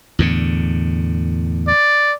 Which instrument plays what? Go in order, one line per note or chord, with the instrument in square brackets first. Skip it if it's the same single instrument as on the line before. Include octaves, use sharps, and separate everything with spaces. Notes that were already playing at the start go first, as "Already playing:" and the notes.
[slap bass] E2 A2 D3
[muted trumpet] D5